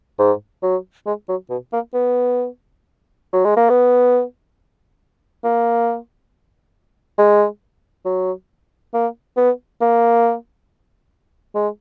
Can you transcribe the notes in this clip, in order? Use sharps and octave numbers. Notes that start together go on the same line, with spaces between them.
G#2
F#3
G#3
F#3
B2
A#3
B3
F#3
G#3
A#3
B3
A#3
G#3
F#3
A#3
B3
A#3
G#3